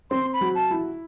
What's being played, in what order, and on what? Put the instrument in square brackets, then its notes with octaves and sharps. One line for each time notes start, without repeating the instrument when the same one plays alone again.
[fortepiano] C4 [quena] C6
[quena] B5
[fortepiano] F#3
[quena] A5
[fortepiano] E4